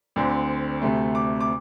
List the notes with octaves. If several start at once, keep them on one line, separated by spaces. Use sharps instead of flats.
D2 D3 C4
D2 C3 A3
D6
D6